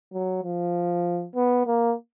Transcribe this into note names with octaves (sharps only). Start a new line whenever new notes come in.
F#3
F3
B3
A#3